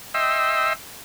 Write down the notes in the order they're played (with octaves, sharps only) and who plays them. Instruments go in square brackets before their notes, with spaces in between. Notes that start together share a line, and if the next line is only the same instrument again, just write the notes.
[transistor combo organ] D#5 E5 G5 C6 E6